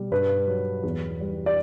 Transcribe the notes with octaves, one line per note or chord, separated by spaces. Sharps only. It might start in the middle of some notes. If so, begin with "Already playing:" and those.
Already playing: B2 G3
G2 B4
F#3
E2
G3
D5